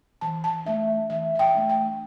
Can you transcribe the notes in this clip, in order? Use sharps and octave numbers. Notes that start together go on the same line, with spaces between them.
E3 A5
A5
A3 D4 E5
E3 E5
E5
G5
A3 D4
G5